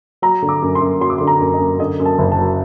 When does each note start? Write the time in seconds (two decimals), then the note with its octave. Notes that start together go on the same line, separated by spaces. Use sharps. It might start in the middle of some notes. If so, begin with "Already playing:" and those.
0.22 F#3 A#5
0.42 D3
0.49 D6
0.62 F#2
0.75 C6
0.81 F#2
1.01 F#3 C6
1.10 D6
1.18 D3 C6
1.27 A#5
1.40 F#2
1.54 D#5
1.60 F#2
1.79 D3 D#5
2.00 F#2
2.05 A5
2.19 F#1
2.32 A5
2.38 F#3